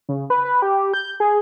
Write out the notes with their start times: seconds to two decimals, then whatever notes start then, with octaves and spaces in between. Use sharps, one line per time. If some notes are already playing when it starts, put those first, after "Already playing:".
0.09 C#3
0.30 B4
0.45 B4
0.62 G4
0.94 G6
1.20 G#4